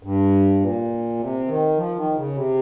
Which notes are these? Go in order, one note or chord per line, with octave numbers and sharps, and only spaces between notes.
G2
A#2
C3
D#3
F3
D#3
C#3
C3